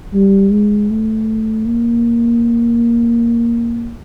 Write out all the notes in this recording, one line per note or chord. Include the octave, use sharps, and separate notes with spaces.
G3
G#3
A3
A#3